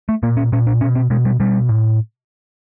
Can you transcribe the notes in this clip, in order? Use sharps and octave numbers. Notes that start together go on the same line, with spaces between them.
A3
A#2 A#3
C#4
A#2 C#4
D4
B2 C#4
C4
B2 G#3
G3
B2 G3
A2